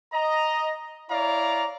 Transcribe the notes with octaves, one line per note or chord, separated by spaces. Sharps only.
D#5 A#5
E4 C#5 D5 F5 A#5